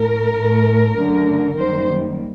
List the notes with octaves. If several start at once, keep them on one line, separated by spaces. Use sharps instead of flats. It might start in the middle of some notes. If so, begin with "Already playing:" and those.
Already playing: A2 A3 A#4
A2 A3
F#2 D3 A3
F#2 D#3 G3 A#3 C5